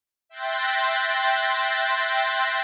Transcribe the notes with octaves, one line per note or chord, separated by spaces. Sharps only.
E5 G5 C6 F#6 A6 A#6